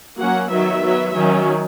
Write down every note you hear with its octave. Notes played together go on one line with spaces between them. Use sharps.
F#3 A#3 C#4 F#5
D#3 F#3 B3 E5
F#3 B3
D#3 F#3 C#4